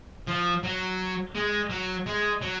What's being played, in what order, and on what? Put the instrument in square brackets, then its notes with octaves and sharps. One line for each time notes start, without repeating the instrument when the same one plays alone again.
[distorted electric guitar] F3
F#3
G#3
F#3
G#3
F#3